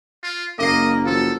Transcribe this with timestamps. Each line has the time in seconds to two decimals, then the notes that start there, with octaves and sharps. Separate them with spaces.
0.23 F4
0.59 F#1 A#3 D#5 D6 C7
1.06 F3 F#3 A4